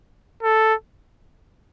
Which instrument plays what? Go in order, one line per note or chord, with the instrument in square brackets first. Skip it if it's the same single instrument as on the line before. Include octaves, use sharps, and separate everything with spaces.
[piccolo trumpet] A4